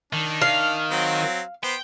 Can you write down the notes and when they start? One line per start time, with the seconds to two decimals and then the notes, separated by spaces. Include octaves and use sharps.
0.13 D#3 D4
0.42 F5
0.91 F#3 C4
1.63 B3 C5 G5